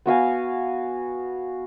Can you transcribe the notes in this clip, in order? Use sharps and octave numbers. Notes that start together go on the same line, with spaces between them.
B3 F#4 F5 G#5